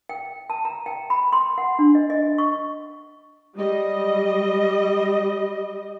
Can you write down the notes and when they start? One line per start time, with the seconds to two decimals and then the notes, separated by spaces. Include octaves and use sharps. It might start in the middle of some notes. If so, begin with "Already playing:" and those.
0.09 G5
0.50 A5
0.65 A#5
0.86 G5
1.10 B5
1.33 C6
1.58 F#5
1.79 D4
1.95 D#5
2.10 D#5
2.38 C#6
3.55 G3 D#5